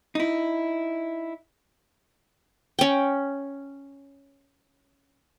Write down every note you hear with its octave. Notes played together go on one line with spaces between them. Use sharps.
D#4 E4
C#4 G5